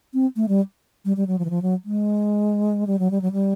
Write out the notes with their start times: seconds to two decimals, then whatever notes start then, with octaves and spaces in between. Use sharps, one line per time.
0.14 C4
0.36 A3
0.48 G3
1.05 G3
1.17 G3
1.27 F#3
1.39 F3
1.45 E3
1.50 F3
1.62 F#3
1.85 G#3
2.87 G3
2.99 F#3
3.11 G3
3.22 F#3
3.32 G3